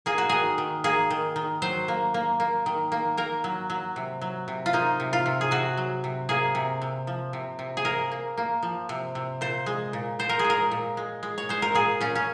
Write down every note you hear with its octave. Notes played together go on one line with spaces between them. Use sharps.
A#3 G#4
F#4
D#3 G#4
D#3
A#3 G#4
D#3
D#3
F#3 C5
A#3
A#3
A#3
D#3
A#3
A#3 A#4
F#3
F#3
C3
F#3
C3
F4
A#3 D#4
C3
F4
C3
G#4
C3 F#4
F#3
C3
A#3 G#4
C3
C3
F3
C3
C3
G#4
A#3 A#4
A#3
A#3
F3
C3
C3
A#2 C5
G#3
A#2
A#2 C5
A#4
G#4
G#3
A#4
A#2
G#3
G#3
C#5
G#3 C5
A#4
A#2 G#4
A#2 C#4
C#4